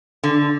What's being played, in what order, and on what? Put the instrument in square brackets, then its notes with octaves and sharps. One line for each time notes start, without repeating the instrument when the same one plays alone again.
[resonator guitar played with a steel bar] D3